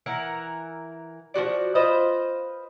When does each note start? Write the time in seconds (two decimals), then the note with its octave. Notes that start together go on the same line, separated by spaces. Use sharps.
0.06 E3 A#4 F#5
1.34 F3 F4 F#4 D5
1.75 F4 B4 C5 D#5